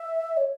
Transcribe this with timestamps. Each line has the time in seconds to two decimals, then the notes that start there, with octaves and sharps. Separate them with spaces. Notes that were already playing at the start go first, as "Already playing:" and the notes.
Already playing: E5
0.37 C#5